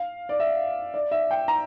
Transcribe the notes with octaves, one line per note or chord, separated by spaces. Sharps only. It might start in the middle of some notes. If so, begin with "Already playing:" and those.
Already playing: F5
D5
E5
D5
E5
G5
A#5